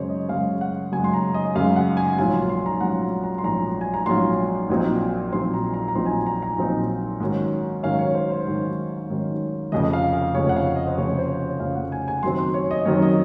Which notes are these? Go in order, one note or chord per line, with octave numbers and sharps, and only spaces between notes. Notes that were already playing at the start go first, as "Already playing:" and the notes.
Already playing: F#2 C#3 G#3 C5 C#5
D#5
F#2 C#3 G#3 F5
F#5
F#2 C#3 G#3 G#5
C6
A#5
D#5
F#2 C#3 G#3 F5
F#5
G#5
A#1 G#2 F#3 C#4 F4 G#5
C6
C6
A#5
A#1 G#2 F#3 C#4 F4 F#5
A#5
A#5
C6
A#1 G#2 F#3 C#4 F4 A#5
G#5
A#5
A#1 G#2 F#3 C#4 F4 C6
A#1 A#2 F#3 C4 D#4
A#1 A#2 F#3 C4 D#4 C6
A#5
A#5
A#5
A#1 A#2 F#3 C4 D#4 C6
G#5
A#5
A#5
A#5
A#1 A#2 F#3 C4 D#4
G#2 D#3 F#3 C#4
G#2 D#3 F#3 C#4 F5
C#5
C5
C5
G#2 D#3 F#3 C#4
G#2 D#3 F#3 C#4
F1 F2 C#3 D#5
F5
F5
F1 F2 C#3 C#5
F#5
F5
D#5
C5
F1 F2 C#3 C#5
C5
C#5
F1 F2 C#3 F5
F#5
G#5
G#5
F#2 D#3 F#3 C4 C6
C6
C#5
D#5
F#2 D#3 F#3 C4 C#5
D#5